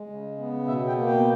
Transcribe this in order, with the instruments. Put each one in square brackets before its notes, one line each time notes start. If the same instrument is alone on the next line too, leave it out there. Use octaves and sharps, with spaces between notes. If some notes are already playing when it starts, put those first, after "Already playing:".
Already playing: [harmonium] G#3
C#3
B3
B2 E5
G5
A#3
G5